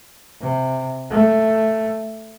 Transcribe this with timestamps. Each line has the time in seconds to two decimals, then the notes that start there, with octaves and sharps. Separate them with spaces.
0.41 C3
1.10 A3